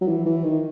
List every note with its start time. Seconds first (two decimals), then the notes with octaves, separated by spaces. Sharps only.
0.01 F#3
0.08 E3
0.25 E3
0.44 D#3